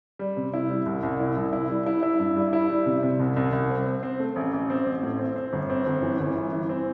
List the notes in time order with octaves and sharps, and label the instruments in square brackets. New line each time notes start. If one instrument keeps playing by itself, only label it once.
[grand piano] G3
C3
E4
G3
C2
C2
E4
C2
E4
G3
E4
E4
G2
G3
E4
G3
C3
C3
C2
C2
C2
C4
C4
C4
A3
A1
A1
C4
A1
A2
C4
C4
G1
C4
G1
E3
G1
E3
E3
C4